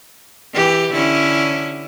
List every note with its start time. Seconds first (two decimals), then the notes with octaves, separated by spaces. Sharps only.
0.54 E3 G4
0.93 D3 C#4 E4